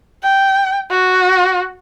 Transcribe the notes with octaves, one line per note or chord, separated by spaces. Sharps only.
G5
F#4